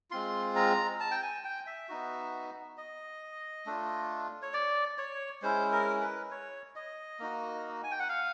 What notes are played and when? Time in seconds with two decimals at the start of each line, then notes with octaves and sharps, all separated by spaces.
0.11 G#3 C4 F4 C6
0.56 A#5
1.00 A5
1.11 G5
1.22 G#5
1.44 G5
1.67 E5
1.89 B3 D#4 F#4
2.77 D#5
3.66 A3 D4 F4
4.42 C#5
4.53 D5
4.98 C#5
5.42 G#3 C#4 E4 C5
5.72 A#4
6.01 B4
6.31 C#5
6.76 D#5
7.20 A#3 D#4 F#4
7.84 G#5
7.91 G5
8.00 F#5
8.09 F5